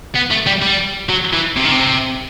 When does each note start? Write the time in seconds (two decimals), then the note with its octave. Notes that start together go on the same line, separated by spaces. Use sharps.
0.16 B3
0.31 A3
0.47 G3
0.62 G3
1.09 F#3
1.33 E3
1.56 C3
1.65 D#3
1.72 C3